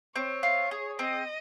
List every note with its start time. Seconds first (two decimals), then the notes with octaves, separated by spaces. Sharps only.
0.16 C4 C#5
0.43 F4
0.71 G#4
0.99 C4 D#5